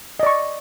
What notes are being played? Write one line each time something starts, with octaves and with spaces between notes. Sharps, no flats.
D5 D#5 C#6